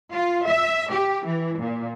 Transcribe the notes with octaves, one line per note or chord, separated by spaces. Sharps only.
F4
E5
G4
E3
A#2